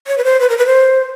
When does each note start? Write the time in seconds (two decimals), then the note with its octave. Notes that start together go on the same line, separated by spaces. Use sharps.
0.07 C#5
0.18 B4
0.24 C5
0.40 B4
0.49 A#4
0.58 B4
0.66 C5